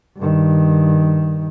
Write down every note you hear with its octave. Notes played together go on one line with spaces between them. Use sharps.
G2 D#3